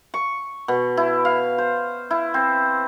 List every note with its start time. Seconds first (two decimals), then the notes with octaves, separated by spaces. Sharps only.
0.14 C#6
0.68 B2
0.97 E4
1.25 F5
1.58 C5
2.11 E4
2.34 C4